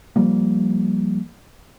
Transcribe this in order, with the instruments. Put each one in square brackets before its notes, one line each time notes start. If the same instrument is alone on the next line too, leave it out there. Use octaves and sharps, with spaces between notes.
[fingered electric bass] F3 G3 A#3